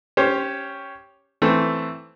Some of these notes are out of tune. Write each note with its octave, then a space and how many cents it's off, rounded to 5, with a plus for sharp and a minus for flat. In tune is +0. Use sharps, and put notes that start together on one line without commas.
C#4 +0 G4 +0 C5 +25
E3 +0 A3 +5 C4 +0